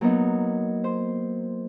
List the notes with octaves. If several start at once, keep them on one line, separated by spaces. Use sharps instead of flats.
F#3 A#3 B3 D#4
C5